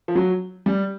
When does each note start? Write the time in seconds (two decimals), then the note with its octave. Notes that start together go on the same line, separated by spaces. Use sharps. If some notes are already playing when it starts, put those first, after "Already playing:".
0.08 F3
0.15 F#3
0.66 G3